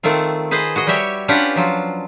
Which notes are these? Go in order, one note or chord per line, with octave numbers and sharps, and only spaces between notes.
D#3 A3 C4 F4
G#4 B4 C5 D#5
F#4 G#4 D#5
G3 F#4 G4 C#5 E5
C#4 D4 F4 G4 B4 F#5
F3 F#3 F4